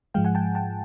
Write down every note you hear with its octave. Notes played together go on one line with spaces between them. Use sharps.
G#2 F3 G#3 F5 G5
F#5 G#5
G5 A5
G5 A5